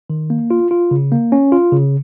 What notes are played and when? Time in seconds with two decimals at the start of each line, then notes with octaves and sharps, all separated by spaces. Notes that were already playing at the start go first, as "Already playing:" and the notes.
0.10 D#3
0.30 A#3
0.51 F4
0.71 F4
0.91 C#3
1.12 A#3
1.32 C#4
1.52 F4
1.72 C#3